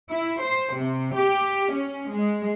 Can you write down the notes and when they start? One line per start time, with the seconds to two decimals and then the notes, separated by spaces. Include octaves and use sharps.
0.10 E4
0.42 C5
0.74 C3
1.15 G4
1.73 C#4
2.11 G#3